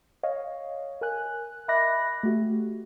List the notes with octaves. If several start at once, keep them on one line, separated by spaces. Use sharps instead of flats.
C#5 D#5 F5
A#4 G#5 F#6
D#5 E5 B5 D6 F#6 A#6
A3 F#4 G4